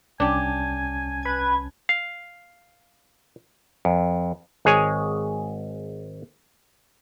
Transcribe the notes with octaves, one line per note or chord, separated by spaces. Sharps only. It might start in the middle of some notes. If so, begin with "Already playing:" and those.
C2 C#4 D4 G4 G#5 A5
B4 G#6
F5
F2
G#1 G#3 G#4 C#5 G#5